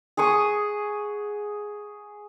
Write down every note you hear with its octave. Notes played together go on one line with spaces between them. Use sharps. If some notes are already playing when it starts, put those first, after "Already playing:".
G#4 F#5 C#6 D#6